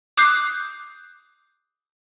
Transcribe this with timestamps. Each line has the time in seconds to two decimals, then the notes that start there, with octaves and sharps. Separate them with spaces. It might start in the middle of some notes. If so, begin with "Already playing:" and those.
0.17 D6 D#6 F#6 G6 C7